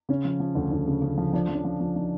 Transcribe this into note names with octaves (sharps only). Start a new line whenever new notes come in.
C#3 C#4
F3
F3
D2
D2
C#3
C#3
F3
F3 D4
F3
C#4
F3
F3
F3 D#4